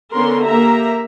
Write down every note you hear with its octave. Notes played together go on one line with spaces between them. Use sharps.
D3 B3 C#4 A#4 C6
A#3 G4 E5 A#5